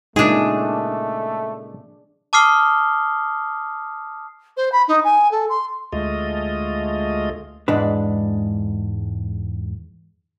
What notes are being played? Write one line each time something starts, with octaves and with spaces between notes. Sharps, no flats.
A#2 C#3 G#3 A3 D4 D#4 G#4
A5 D6 D#6 F6 C7 G7
C5
B5
D#4
G#5
A4
C6
D2 G#3 A3 F4 D#5
E2 G#2 G#3 D4 B4